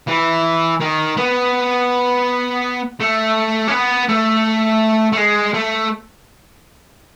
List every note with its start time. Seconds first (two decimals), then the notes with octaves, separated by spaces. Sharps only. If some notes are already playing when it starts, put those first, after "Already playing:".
0.08 E3
0.80 D#3
1.17 B3
3.00 A3
3.68 C#4
3.71 B3
4.09 A3
5.12 A3
5.17 G#3
5.54 A3